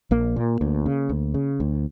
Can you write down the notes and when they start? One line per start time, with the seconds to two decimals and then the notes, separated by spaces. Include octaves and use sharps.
0.11 A#1 A#3
0.36 A#2
0.61 D2
0.86 C#3
1.09 D2
1.34 C#3
1.60 D2